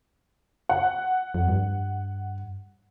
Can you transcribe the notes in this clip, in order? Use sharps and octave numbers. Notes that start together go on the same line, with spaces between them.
F#5
F2
G2